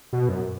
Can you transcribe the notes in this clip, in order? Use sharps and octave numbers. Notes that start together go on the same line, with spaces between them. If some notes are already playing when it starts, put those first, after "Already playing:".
B2
F#2